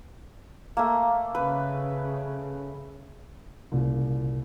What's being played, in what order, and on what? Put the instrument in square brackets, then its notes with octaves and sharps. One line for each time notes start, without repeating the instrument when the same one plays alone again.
[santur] A3 A#3
[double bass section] C#3 [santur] B4
[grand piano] C2 A#2 C#3